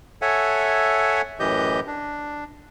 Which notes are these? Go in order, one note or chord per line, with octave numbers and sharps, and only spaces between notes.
A4 C#5 E5 F#5 G#5
F#2 A2 E3 G4 D#5 G6
D4